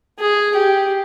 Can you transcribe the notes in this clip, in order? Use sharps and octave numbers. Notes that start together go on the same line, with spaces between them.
G#4
G4